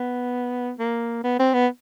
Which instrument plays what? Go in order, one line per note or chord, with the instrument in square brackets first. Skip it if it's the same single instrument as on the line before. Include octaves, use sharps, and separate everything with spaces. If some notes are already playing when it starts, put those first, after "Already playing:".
Already playing: [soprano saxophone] B3
A#3
B3
C4
B3